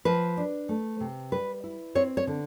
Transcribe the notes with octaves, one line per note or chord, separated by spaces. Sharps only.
F3 B4
D4
A3
C3
G3 B4
E4
C4 C#5
C#5
D3